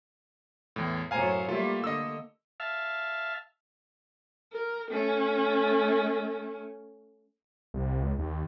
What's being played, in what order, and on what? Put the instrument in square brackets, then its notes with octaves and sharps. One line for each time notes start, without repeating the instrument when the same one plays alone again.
[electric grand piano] E2 A2
[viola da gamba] F#2 A2 C5 [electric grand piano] F5 G#5 A#5
[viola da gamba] G3 A3 A#3 [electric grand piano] F4 E5
[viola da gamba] D3 [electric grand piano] D#5 E6
[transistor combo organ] E5 F5 A5
[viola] A#4
A3 C#4
[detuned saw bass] C2
C#2
D#2